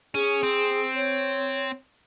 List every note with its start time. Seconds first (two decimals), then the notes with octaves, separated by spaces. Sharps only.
0.15 C#4 G#4
0.43 C4
0.95 C#5